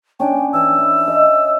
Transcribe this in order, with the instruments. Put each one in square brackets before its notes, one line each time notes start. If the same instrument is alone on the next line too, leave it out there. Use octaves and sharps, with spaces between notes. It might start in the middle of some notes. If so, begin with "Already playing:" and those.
[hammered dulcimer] C#4 D4 [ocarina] G5
[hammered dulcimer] E3 [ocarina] E6
[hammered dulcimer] E4
D#5